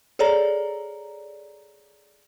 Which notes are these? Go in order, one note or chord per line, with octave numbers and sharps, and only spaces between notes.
G#4 A4 C#5 D5 A#5